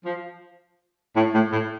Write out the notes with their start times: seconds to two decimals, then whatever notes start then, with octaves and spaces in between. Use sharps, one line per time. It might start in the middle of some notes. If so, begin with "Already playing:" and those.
0.05 F3
1.16 A2
1.34 A2
1.52 A2